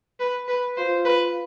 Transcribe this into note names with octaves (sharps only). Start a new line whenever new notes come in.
B4
B4
F4 C5
B4